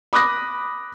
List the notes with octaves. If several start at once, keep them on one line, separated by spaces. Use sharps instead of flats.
B5 D6 D#6 F#6 A#6